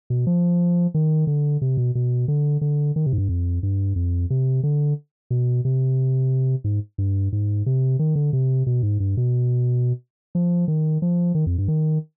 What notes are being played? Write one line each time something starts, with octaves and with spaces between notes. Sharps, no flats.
B2
F3
D#3
D3
C3
B2
B2
D3
D3
D#3
C3
G#2
G2
F2
G2
F2
C3
D3
B2
C3
G#2
G2
G#2
C3
D#3
D3
C3
B2
G#2
G2
B2
F3
D#3
F3
D#3
F2
G2
D#3